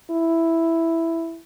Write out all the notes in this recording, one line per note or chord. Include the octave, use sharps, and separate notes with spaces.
E4